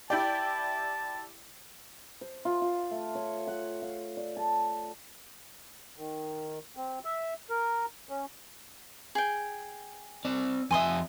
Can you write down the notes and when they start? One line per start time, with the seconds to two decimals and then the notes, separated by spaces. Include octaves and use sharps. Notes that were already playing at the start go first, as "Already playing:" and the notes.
0.10 E4 G4 D5 G5 A5
2.21 C5
2.45 F4
2.62 F4
2.91 A3
3.15 C#5
3.47 F#5
3.82 F5
4.17 D5
4.37 A5
5.97 D#3
6.77 C4
7.05 E5
7.50 A#4
8.09 C#4
9.15 G#4 G5
10.25 C4 D5
10.71 F2 E5 G#5 C6 D#6